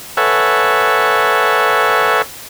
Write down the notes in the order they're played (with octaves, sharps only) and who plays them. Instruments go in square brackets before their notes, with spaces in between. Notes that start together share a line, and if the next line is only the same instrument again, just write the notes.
[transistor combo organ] A4 B4 C#5 E5 F#5 G#5